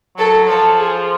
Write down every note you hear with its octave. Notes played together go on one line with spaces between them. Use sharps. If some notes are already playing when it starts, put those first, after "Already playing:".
F#3 A4
F3 A4
G#4